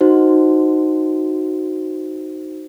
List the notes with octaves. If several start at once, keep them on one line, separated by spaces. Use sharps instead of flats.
D#4 F#4 C5